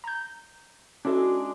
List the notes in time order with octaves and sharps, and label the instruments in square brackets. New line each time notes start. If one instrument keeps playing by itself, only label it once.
[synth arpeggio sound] A#5 G6
[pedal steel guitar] G#3 D4 [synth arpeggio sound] C#4 E4 A4 [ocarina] F#4